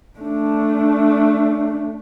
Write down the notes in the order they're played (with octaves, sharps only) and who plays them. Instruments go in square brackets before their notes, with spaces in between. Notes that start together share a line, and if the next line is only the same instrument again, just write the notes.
[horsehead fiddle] A3 D4